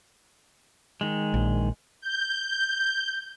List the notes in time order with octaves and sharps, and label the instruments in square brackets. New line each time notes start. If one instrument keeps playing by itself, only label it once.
[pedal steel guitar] D#3 G#3
[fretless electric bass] A#1
[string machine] G6